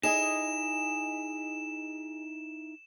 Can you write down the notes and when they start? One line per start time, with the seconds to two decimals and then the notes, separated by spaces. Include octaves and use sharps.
0.03 D#4 E4 G#4 D#5 G#5 E7